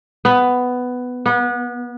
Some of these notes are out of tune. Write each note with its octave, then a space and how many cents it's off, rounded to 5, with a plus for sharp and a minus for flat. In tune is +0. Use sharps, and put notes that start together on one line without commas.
B3 +10
B3 -30